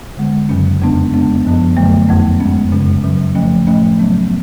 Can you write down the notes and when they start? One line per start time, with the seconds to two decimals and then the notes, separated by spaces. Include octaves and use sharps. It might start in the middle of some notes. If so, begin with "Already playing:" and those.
0.17 D3 G#3 B3
0.49 F#2 C#3 F#3 C#4
0.82 F2 C#3 G#3 B3 D4
1.13 C#3 G#3 B3 D4
1.45 F#2 F3 B3
1.77 F#2 D3 F#3 A3
2.09 F2 F3 B3
2.40 G#2 G#3 C#4
2.72 F#2 C#3 G#3 C#4
3.04 C#3 F#3 C#4
3.35 C#3 F3 A3 C#4
3.67 A2 F3 A3 C#4
3.99 C#3 F#3 B3